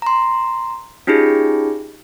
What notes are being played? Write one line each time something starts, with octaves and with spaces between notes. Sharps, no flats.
A#5 C6
C#4 D#4 F4 G4 G#4